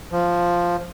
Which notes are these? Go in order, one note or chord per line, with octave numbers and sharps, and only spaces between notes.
F3